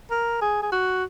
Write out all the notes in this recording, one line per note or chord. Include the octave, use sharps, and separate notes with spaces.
A#4
G#4
G#4
F#4